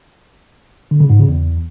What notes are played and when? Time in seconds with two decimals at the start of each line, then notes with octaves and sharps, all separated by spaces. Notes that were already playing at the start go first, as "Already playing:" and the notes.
0.91 D3
1.00 C#3
1.10 G#2
1.19 C#3
1.28 E2